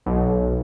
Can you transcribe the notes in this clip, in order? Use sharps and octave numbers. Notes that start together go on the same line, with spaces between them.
B1